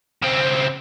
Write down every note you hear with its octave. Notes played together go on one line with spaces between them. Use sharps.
C#3 C4